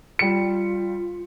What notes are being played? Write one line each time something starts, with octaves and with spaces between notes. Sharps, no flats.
G3 F4 C#7